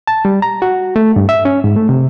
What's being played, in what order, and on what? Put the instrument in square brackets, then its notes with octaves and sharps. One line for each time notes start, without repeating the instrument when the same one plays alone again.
[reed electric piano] A5
G3
A#5
F#4
A3
G2
E5
C#4
G#2
A3
C3